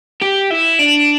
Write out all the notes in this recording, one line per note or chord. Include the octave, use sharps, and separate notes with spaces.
G4
E4
D4